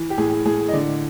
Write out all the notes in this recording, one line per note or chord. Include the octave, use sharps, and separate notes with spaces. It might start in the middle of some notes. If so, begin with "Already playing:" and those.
Already playing: E3
G4
A2 G#4
A2 G#4
D#5
D3 D5